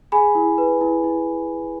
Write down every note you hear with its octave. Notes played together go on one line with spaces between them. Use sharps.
G#4 G#5 B5
E4
B4
E4
E4